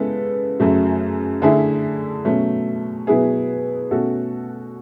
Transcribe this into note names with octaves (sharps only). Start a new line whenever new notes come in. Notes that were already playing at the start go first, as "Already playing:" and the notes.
Already playing: C#3 G#3 B3 E4 A4
F#2 C#3 F#3 A3
D3 A3 E4 G#4
B2 F#3 A3 C#4
B2 F#3 B3 E4 G#4
B2 A3 C#4 F#4 A4